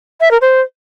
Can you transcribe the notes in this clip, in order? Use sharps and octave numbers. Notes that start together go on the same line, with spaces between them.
E5
A#4
C5